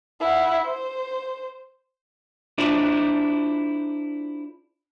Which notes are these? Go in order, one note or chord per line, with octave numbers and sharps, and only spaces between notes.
E4 F#5
C5
D4 E4 F4 G#4 C5